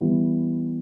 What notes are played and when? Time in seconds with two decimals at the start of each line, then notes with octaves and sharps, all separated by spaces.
0.01 E3 G3 B3